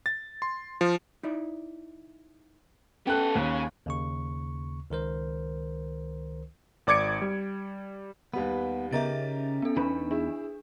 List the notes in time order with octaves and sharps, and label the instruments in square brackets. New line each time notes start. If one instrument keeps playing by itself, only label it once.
[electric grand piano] A6
C6
F3
[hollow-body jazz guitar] D#4 E4 D5
[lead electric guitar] B3 A4 [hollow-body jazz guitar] C#4 [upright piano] G5 F#6
[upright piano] D#2 [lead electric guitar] C#3
[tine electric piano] D#2 C#3 C#6
C#2 D#3 A#4 C5
[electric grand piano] G#1 D5 D6 G#6 C#7 D7
G3
[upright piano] D#2 G3 B4 [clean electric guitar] B3
[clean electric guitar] C#3 [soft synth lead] B3 [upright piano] D#4 G4 A#4 [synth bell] E5 A#5 A6
[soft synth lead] C#4
[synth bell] B3 A4
[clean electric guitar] E2 D#4 B5 [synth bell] D4 [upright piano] B4
[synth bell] D4 [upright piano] E4 E5 [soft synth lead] G#4